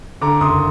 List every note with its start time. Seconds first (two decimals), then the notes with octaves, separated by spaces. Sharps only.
0.21 D3 A#5 D6
0.41 F#1 C6 D#6